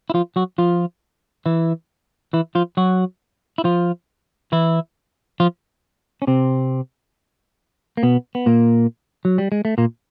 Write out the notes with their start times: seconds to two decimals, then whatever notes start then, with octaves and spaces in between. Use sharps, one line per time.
0.10 E4
0.14 F3 F4
0.36 F#3 F#4
0.58 F3 F4
1.46 E3 E4
2.33 E3 E4
2.55 F3 F4
2.77 F#3 F#4
3.58 E4
3.64 F3 F4
4.52 E3 E4
5.40 F3 F4
6.22 C#4
6.27 C3 C4
7.97 A#3
8.03 B2 B3
8.35 B3
8.46 A#2 A#3
9.25 F#3
9.38 G3
9.52 G#3
9.65 A3
9.78 A#2 A#3